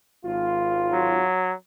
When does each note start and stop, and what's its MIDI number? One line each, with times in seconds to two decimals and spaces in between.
0.24 1.25 32
0.24 1.25 65
0.93 1.53 54